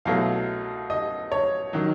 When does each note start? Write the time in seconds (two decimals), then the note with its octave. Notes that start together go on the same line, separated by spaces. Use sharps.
0.05 C2 B2 F#3 A3 F5
0.90 D#5
1.32 C#5
1.73 D#3 F#3